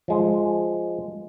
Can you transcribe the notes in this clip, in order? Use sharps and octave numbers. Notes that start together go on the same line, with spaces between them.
F3 G#3